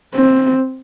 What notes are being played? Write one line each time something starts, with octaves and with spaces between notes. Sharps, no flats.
C4